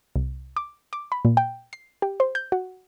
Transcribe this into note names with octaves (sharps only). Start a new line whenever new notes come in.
C2
D6
D6
B5
A#2
G5
C7
G4
C5
G6
F#4